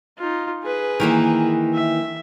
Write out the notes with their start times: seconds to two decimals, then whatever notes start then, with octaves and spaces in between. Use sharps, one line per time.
0.18 D#4 F4
0.62 G#4 B4
1.00 D#3 E3 A#3
1.73 E5